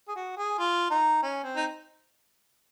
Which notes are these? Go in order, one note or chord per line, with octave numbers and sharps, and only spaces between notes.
G#4
F#4
G#4
F4
D#4
C#4
C4
D#4